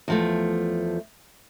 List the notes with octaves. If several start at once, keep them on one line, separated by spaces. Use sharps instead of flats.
E2 F3 A3